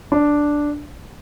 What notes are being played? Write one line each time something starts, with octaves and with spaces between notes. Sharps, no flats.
D4